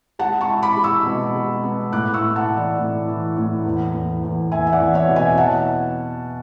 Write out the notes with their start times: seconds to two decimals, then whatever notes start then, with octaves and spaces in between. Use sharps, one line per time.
0.19 G#3 F#5 A5
0.41 A5 C#6
0.48 E4
0.63 B5 D6
0.77 G#3
0.84 C#6 E6
1.06 B2
1.35 G#3
1.63 B3
1.92 A2 D6 F#6
2.14 C#6 E6
2.21 A2
2.36 F#5 A5
2.49 E3
2.57 D5
2.78 A2
3.08 E3
3.37 A2
3.65 E2
3.93 E2
4.23 E2
4.51 E2 E5 G#5
4.67 E5
4.73 D5 F#5
4.80 E2
4.94 C#5 E5
5.08 B2
5.16 E5 G#5
5.37 E3 F#5 A5